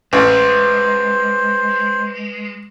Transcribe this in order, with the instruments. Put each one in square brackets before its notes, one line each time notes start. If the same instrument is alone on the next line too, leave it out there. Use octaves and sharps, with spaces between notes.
[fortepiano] A1 [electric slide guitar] G#3 [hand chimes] B4 [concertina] C5